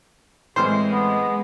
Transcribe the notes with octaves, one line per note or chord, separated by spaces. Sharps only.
A2 E3 G#3 C4 C5 F6
B3